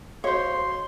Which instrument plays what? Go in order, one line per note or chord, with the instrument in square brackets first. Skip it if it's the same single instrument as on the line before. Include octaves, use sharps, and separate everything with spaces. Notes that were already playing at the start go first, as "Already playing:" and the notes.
[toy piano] F#4 D#5 F5 [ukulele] C5 C#5 [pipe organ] C6